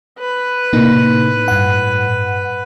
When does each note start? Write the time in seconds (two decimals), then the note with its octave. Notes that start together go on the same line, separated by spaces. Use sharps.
0.19 B4
0.73 A2 C3 A#3 D#4
1.48 G2 F#5